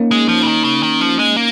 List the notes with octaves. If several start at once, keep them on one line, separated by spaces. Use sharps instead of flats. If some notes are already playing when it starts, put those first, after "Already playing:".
Already playing: A#3 C#4 D#4
G#3
F3
C#3
D#3
C#3
D#3
F3
G#3
A#3